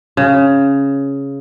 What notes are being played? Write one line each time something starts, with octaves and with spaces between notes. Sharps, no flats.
C#3